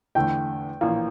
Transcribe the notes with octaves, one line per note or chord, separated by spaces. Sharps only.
E2 D3 A3 G5
A#1 A2 E3 A#3 F4